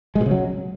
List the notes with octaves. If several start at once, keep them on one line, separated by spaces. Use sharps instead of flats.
G#3
B2
C#3
F#3